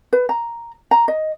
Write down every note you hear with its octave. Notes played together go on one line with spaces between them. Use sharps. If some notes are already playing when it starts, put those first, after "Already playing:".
B4
A#5
A#5
D#5